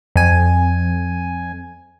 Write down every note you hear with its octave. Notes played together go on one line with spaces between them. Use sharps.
F2 G#5